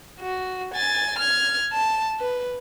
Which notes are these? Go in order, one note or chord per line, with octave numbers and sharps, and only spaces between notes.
F#4
G#5 A6
F6 G#6
A5
B4